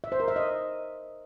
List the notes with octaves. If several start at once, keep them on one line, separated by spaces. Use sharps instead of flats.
E5
C5
A#4
E5
D#5